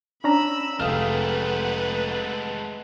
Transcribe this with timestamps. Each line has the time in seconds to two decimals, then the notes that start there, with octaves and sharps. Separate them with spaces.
0.24 C#4 D4 A#5 B5 E6
0.80 F1 G#3 A3 B4 F5 F#5 D#6 F6